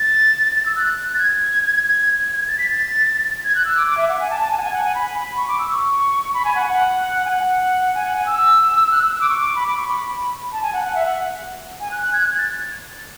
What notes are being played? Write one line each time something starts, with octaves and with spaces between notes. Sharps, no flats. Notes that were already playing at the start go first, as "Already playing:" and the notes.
Already playing: A6
A6
E6
F#6
A6
G#6
G#6
A6
B6
A6
G#6
F#6
E6
D6
D6
E5
F#5
G#5
A5
A5
G#5
F#5
G#5
F#5
G#5
B5
C#6
D6
E6
C#6
B5
G#5
F#5
F#5
G#5
F#5
G#5
F#5
G#5
E6
F#6
E6
E6
D6
C#6
D6
B5
D6
C#6
B5
A5
G#5
F#5
F#5
E5
F#5
G#5
F#6
F#6
G#6
F#6
G#6
A6